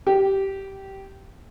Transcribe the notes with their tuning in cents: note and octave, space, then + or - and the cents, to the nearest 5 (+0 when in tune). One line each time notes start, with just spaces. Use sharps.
G4 -15